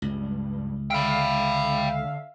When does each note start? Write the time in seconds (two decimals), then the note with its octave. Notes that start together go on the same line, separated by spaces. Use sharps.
0.02 C#2 G2
0.91 D3 E5 F5 G5 B5